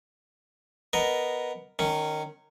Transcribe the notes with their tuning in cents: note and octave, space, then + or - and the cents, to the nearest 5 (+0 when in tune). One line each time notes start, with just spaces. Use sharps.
B3 +0 A#4 +0 D#5 -10
D#3 -20 C#4 +0